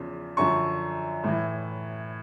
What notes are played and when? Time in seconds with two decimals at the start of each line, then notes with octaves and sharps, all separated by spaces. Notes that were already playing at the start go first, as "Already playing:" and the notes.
Already playing: E2 C#3 F3
0.37 F#2 D3 F3 C#6
1.24 A2 E3